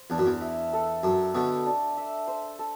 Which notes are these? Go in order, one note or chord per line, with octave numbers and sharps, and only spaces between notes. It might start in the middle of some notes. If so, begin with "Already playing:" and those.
Already playing: C5
E2 D4
F#2
E2
E5
A4
F#2 A4
B2 D3 A4
D4
E5
C5
A4